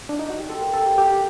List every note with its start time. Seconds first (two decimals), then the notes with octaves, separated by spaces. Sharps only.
0.09 D4
0.19 D#4
0.30 F#4
0.39 G4
0.49 C4 A4
0.61 A#4
0.73 C3 A4
0.86 G4
0.98 F#3 G4